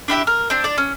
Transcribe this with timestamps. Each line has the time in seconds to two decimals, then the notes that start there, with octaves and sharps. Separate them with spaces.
0.08 D4 E4 G4 E5
0.27 A#4
0.50 C4 D4
0.64 D4 D5
0.78 C#4